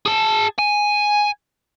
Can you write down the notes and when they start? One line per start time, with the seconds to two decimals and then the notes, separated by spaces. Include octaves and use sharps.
0.06 G#4 A5
0.59 G#5